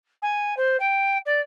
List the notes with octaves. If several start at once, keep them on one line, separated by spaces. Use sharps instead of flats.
G#5
C5
G5
D5